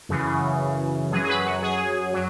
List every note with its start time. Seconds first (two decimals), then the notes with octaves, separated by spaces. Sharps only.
0.09 F#2 C#3 E3
1.11 F#2 F#3 G#4
1.24 G#4
1.29 B4
1.46 F#4
1.62 G#4
2.14 F#3